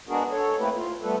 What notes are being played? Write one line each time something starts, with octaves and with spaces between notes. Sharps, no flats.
G#3 B3 D4 F#4 G#4 A#4
A4 C#5
A3 A#3 C4 E4 G4 B4
F4
G3 A3 B3 A4 B4